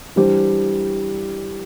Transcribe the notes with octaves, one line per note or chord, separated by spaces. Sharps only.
E3 G3 D4 G4 C5